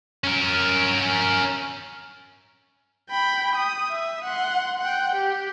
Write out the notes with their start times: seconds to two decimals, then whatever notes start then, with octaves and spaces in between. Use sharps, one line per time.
0.24 C#4 A#4
3.11 G5 B5
3.55 D#6
3.90 E5
4.24 F#5 C6
4.79 F#5 G5
5.15 G4